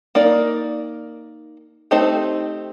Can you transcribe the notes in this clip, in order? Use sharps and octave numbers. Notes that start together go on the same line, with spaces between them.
A#3 D#4 A#4 D5
A3 C4 D#4 G4 C5